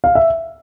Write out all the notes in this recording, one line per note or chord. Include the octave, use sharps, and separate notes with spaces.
F5
E5